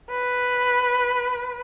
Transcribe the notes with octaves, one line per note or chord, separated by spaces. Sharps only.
B4